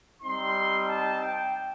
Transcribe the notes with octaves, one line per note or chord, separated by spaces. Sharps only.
G3 C4 D#4 C6
A5
G5